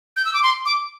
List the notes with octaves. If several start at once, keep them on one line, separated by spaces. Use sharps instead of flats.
G6
E6
D6
C6
D6